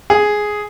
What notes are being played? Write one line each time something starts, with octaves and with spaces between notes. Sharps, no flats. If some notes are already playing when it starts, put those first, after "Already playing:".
G#4